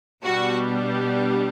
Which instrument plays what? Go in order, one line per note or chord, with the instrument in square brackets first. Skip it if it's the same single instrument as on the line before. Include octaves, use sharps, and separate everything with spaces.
[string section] B2 G3 B3 D4 F#4